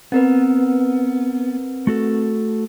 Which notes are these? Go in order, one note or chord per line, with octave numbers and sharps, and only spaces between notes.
B3 C4 A#4 B4
A3 F#4 A4